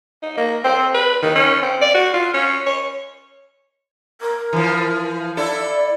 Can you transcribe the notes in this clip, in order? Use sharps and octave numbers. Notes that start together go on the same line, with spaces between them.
D#4
A#3
C4
B4
D#3
C#4
C4
D5
F#4
F4
C#4
C#5
A#4
E3 F3
E4 A4 D5